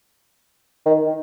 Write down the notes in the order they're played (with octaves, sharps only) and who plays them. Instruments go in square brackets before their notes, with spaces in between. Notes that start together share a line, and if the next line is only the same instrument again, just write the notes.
[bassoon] D#3